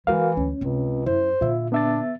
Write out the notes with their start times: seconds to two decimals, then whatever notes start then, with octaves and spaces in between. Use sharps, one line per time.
0.07 E3 G#3 E4 F#4 A#4 F5
0.37 D2 C#4
0.61 C#2 C3 C4
1.06 F#2 E4 C5
1.41 A#2 D3 F4 E5
1.72 B3 D4 E5 A6